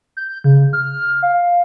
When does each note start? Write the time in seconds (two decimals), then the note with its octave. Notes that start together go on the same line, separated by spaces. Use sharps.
0.17 G6
0.44 C#3
0.73 F6
1.23 F5